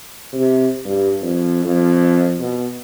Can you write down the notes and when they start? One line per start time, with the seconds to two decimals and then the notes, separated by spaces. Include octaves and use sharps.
0.33 C3
0.85 G2
1.22 F2
1.65 F2
2.40 B2